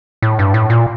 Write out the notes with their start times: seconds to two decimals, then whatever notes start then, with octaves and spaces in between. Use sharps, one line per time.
0.22 A2
0.39 G2
0.54 A2
0.70 A#2